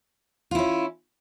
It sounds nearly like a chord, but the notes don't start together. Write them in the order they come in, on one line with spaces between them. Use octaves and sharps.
F4 E4 C#4